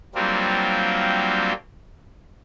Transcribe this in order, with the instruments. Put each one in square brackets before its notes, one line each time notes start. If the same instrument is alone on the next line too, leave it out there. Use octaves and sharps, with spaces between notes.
[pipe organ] F#3 G3 A#3 C4 D4 F4